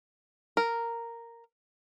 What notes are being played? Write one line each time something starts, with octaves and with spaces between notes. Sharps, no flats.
A#4